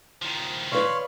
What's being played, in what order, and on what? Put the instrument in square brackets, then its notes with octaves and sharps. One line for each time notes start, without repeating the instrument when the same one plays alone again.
[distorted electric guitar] D#3 F3
[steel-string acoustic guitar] B4 D5 [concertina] C#5 F5 C6